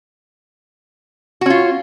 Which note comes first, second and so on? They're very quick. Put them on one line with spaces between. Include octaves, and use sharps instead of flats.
F#4 C#4 F4